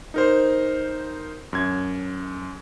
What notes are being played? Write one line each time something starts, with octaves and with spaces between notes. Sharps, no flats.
D#4 A#4 C5
F#2 G#6